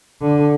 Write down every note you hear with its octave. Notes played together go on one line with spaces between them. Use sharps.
D3